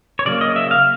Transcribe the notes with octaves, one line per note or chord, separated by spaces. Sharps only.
C#5
C#3 F#3 A#3 D5
D#5
E5
F5